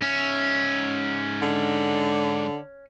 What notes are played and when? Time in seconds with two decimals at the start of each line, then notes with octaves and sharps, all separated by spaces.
0.02 G#2 C#4 E5
1.42 D3